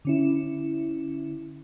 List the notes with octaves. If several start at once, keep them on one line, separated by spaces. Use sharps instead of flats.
D3 C#4 E4